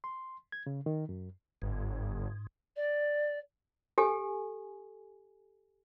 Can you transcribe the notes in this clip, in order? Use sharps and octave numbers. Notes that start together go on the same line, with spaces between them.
C6
G#6
C#3
D#3
F#2
G1 G#2
D5
G4 A4 G#5